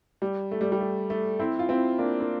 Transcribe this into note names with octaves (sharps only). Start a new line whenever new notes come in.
G3
A3
G3
G3
A3
A3
C4 E4
F4
C4 E4
A#3 D4
A#3